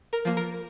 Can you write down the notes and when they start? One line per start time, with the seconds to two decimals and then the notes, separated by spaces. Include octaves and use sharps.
0.13 A#4
0.25 F3 A#3
0.37 A#4